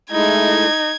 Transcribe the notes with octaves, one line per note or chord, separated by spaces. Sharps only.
G#3 A3 D#4 E4 G#6